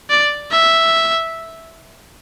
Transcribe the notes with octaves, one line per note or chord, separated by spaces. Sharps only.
D5
E5